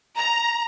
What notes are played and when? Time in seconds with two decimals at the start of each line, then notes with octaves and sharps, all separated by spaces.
0.16 A#5